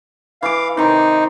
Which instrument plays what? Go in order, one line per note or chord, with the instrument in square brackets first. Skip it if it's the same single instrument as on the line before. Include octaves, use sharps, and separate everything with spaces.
[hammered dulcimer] E3 D6 [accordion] F5
[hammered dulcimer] C3 D#3 [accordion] D#4